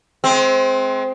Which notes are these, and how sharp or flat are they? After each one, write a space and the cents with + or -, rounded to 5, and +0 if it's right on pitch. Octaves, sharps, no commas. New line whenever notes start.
G#3 +35 C4 +0